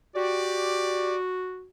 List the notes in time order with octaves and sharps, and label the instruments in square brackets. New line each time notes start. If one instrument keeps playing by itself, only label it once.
[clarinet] F#4 [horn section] G4 D5